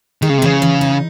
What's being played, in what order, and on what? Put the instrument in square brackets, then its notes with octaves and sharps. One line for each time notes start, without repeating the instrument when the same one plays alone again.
[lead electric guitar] D#3 [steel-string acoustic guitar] G#3
[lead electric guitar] C#3
C3
[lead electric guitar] C#3 [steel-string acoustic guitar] E3
[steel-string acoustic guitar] E3
D#4